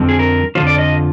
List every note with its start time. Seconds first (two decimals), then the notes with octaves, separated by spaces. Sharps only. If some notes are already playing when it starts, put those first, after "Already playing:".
Already playing: F2 D3 F3 C4
0.09 G#4
0.19 A#4
0.55 F2 D3 F3 C4 F4 C5
0.67 D5
0.78 D#5